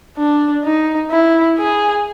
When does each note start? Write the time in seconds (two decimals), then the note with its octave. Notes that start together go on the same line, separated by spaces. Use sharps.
0.18 D4
0.64 D#4
1.11 E4
1.58 G#4